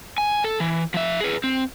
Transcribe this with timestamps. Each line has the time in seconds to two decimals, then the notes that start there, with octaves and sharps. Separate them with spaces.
0.18 G#5
0.44 A4
0.60 E3
0.94 F3 E5
1.20 G#4 B4
1.44 C4